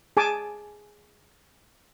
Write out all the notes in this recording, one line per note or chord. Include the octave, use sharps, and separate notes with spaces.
G#4 G#5 A5 D6